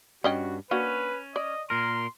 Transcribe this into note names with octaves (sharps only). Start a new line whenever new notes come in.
G2 C#4 F#4 D#5 G5
A#3 C#4 D4 F#4 B4
D5 D#5
A#2 A#4 C6